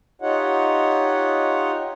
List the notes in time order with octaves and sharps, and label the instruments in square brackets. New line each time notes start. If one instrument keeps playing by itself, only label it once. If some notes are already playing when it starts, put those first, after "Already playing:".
[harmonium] D#4 F4 G4 C#5 D#5 F#5